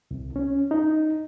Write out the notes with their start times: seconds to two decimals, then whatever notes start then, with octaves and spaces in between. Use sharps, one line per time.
0.11 C2
0.36 C#4
0.71 D#4